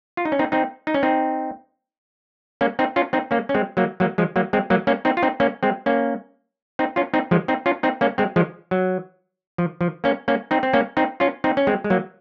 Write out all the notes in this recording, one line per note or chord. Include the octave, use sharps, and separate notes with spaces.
F4
D#4
C#4
C4 D#4
C4 D#4
D#4
C#4
C4 D#4
A#3 C#4
C4 D#4
C#4 F4
C4 D#4
A#3 C#4
C#4
G#3 C4
F#3 A#3
F#3 A#3
F3 G#3
F#3 A#3
G#3 C4
F#3 A#3
A#3 C#4
C4 D#4
F4
C4 D#4
A#3 C#4
G#3 C4
A#3 C#4
C4 D#4
C#4 F4
C4 D#4
F3 G#3
C4 D#4
C#4 F4
C4 D#4
A#3 C#4
G#3 C4
F3 G#3
F#3
F3
F3
A#3 C#4
A#3 C#4
C4 D#4
C4
A#3 C#4
C4 D#4
C#4 F4
C4 D#4
C#4
G#3 C4
G#3
F#3 A#3